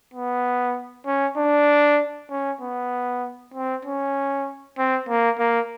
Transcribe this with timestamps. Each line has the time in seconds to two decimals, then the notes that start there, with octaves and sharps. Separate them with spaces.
0.14 B3
1.06 C#4
1.37 D4
2.30 C#4
2.61 B3
3.54 C4
3.85 C#4
4.78 C4
5.09 A#3
5.39 A#3